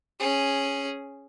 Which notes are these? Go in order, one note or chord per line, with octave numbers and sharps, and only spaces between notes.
C#4 G#4